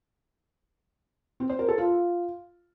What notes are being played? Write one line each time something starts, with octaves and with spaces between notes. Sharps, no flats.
C4
C5
A#4
A4
F4